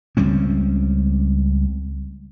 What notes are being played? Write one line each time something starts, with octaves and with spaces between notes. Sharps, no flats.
C#2 G3 C4 C#4